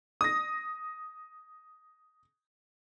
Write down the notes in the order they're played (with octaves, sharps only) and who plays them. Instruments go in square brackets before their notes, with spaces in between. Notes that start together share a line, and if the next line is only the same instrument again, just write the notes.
[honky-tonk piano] D#6 A#6